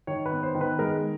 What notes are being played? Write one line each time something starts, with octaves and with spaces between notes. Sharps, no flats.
D#3 C#5
B4
B3
C5
D#3
B4
G#3 A#4